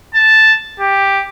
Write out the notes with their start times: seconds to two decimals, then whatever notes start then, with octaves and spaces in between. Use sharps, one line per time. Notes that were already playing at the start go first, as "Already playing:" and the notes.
0.14 A5
0.80 G4